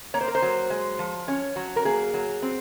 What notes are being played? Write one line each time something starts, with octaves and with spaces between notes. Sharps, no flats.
A#3 C#5
C5
A#4
C5
F#3
G#3
F3
C#4 C#5
F#3 F#4
A#4
A#3 G#4
F#3
C4